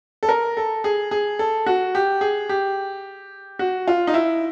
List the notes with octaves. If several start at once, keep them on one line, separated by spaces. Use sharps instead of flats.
A4
A#4
A4
G#4
G#4
A4
F#4
G4
G#4
G4
F#4
F4
D#4
E4